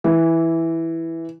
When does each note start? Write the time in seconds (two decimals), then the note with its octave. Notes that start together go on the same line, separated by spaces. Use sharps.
0.04 E3